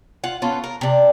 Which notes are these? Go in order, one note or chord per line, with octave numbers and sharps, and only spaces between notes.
F4 F#5
B3 C#4 F4 A4
A#4
C3 D4